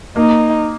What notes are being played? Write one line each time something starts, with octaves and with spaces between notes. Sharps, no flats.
A#3 D#4